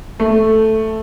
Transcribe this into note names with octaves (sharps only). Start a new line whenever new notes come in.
A3